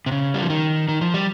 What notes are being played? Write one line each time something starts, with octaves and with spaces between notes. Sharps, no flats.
C3
C#3
G3
F3
D#3
D#3
F3
G3